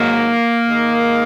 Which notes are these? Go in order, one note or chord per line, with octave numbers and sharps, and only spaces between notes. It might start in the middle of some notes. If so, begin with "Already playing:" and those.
Already playing: G#2 D#3 F#3 A#3
G#2 D#3 G#3